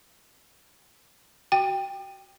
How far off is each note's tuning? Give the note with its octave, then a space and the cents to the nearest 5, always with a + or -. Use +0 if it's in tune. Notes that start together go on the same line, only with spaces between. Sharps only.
F#4 +20 G5 +5